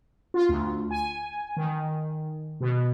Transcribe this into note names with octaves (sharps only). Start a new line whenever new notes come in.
F4
D2
G#5
D#3
B2